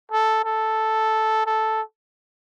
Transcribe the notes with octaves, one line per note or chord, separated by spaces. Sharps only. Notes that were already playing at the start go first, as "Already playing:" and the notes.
A4
A4
A4